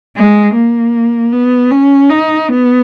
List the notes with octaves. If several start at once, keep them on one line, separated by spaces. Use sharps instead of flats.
G#3
A#3
B3
C#4
D#4
B3